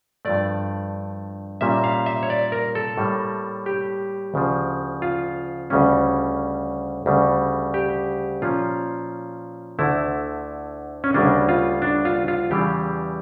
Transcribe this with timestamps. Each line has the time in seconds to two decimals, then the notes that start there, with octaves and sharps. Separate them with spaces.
0.25 G2 F3 A3 D5
1.61 A#2 G3 A#3 C#4 E5
1.84 F5
2.06 E5
2.23 C#5
2.30 D5
2.52 A#4
2.75 A4
2.98 A2 G3 A#3
3.66 G4
4.34 D2 C#3 F3
5.02 F4
5.70 D2 C#3 G3 C#4
7.06 D2 C#3 G3
7.74 G4
8.42 A#2 F3 C#4 F4
9.79 D2 D3 A3 E4
11.04 C#4
11.14 D2 C#3 G3 A#3 C#4 D4
11.49 F4
11.82 D4
12.05 F4
12.28 F4
12.50 E2 C#3 E3 G3 G4